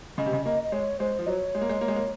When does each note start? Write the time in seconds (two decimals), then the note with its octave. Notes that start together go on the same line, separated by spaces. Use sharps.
0.18 C#3 D#5
0.26 C3
0.33 C#3
0.46 A#3 D#5
0.63 D#5
0.72 G#3 C#5
1.00 G#3 C5
1.19 F3
1.26 F#3 D#5
1.30 C#5
1.55 G#3
1.61 A#3
1.69 G#3
1.81 A#3
1.88 G#3
1.96 A#3